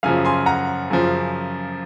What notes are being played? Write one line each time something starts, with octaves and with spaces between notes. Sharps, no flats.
F#2 C#3 F3 F5 G#5
G#5 C6
F#5 A#5
F#2 C#3 F3